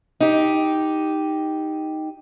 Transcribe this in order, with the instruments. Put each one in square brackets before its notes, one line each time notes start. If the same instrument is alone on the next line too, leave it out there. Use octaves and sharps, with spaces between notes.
[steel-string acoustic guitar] D#4 G4